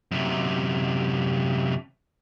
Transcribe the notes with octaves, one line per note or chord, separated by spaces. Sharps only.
F#2 C3